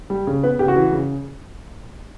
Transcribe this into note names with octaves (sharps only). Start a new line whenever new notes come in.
G3
C#3
B3 B4
C#3 G4
F#4
E3
C#3